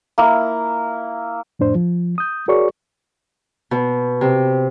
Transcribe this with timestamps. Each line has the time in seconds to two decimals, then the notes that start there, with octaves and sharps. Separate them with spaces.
0.18 A#3 E4
1.59 F2 A2 D4 C5
1.75 F3
2.18 D#6 G6
2.48 F#4 G#4 A#4 C#5 D5 C#6
3.71 B2
4.21 C3